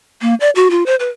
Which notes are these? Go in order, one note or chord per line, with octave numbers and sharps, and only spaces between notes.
A#3
D5
F#4
F4
C5
B4